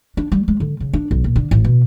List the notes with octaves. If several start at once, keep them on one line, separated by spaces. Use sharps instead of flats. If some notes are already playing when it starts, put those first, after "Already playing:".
D4
G3
G#3
D3
C#3
D4
B1
A#2
D3
A1
B2